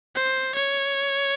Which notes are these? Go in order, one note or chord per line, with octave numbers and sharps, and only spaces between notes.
C5
C#5